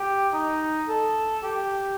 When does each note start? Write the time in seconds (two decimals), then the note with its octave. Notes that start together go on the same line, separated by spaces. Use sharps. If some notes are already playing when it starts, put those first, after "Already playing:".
Already playing: G4
0.33 D#4
0.88 A4
1.44 G4